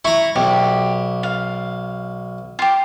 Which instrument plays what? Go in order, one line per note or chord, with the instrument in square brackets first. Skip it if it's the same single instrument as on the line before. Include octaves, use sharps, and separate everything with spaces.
[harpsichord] E4 A#5 [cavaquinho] C#6
[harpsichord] B1 [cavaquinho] G4
[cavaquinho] F5
F4 G4